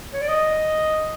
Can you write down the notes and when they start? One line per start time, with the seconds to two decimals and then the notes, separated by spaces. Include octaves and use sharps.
0.13 C#5
0.21 D5
0.28 D#5